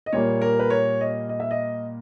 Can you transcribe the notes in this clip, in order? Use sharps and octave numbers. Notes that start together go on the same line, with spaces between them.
D#5
A#2 G3 A#3 C#5
A#4
B4
C#5
D#5
D#5
E5
D#5